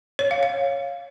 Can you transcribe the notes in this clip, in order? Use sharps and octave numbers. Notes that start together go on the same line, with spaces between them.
C#5
F5
F5